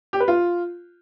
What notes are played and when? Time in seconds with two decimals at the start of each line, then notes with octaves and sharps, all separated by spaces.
0.13 G4
0.20 B4
0.28 F4